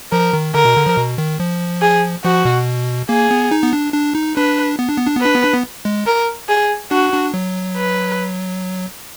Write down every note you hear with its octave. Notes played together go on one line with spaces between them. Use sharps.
F3 A#4
D#3
D3 A#4
B2
D3
F3
B2
D#3
F3
G#4
F3 F#4
B2
A#3 G#4
B3
D#4
B3
D4
D4
D#4
D4 B4
B3
D4
B3
D4
B3
D4 B4
B3
D4
B3
G#3
A#4
G#4
D4 F#4
D4
F#3
B4